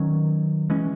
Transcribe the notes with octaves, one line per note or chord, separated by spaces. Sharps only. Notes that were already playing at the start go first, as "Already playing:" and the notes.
Already playing: D#3 F#3 C#4
E3 G#3 C#4